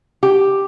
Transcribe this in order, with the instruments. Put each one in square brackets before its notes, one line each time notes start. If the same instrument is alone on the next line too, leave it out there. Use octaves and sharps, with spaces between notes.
[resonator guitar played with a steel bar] G4